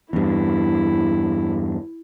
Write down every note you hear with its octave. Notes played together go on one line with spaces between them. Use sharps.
E2 G2 E4